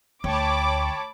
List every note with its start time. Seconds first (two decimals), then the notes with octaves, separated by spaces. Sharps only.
0.24 D2 C#5 G5 A5 B5 D6